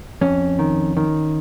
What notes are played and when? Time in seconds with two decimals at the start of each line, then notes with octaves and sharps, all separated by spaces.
0.21 F2 C#4
0.59 D#3
0.97 D#3